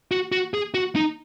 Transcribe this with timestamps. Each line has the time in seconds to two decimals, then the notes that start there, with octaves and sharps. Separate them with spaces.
0.11 F#4
0.32 F#4
0.54 G#4
0.74 F#4
0.96 D#4